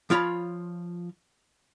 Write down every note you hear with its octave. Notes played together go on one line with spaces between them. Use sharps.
F3 F4 C#5 A#5 B5